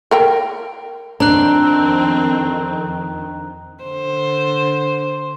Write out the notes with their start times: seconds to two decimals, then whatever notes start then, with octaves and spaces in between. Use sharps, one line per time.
0.11 A4 A#4 G5
1.20 F2 D#3 C4 D4 A#5 F#6
3.84 D3 C5